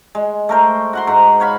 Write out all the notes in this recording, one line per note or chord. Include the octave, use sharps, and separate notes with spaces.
G#3
A3 A#4 C5
F#4 F#5 C6
G#2 A#5
F#4 C#5 F5 B5